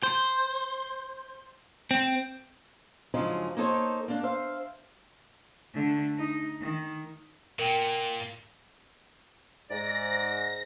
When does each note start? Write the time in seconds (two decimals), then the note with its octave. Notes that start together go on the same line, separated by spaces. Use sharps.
0.03 C5
1.91 C4
3.14 F#2 C#3 F3 G#3 D4 D#4
3.57 A#3 D#4 A4 C5 C#5
4.08 A#3 D4
4.23 C5 E5 F5
5.73 D3 A3
6.18 D#4
6.61 D#3
7.59 A#2 A#4 G5
9.70 G#2 D5 A#6